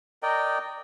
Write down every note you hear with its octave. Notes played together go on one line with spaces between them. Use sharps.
A#4 D5 D#5 G5